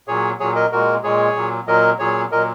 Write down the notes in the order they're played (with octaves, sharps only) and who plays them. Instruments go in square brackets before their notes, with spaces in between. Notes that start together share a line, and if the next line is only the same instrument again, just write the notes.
[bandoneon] A#2 F#3 G#4 C#5
A#2 F#3 G#4 C#5
A#4 D#5
A#2 G#3 F#4 A#4
A#2 G#3 G#4 C#5
A#2 F#3
A#2 F#3 A#4 D#5
A#2 F#3 G#4 C#5
A#2 F#3 A#4 D#5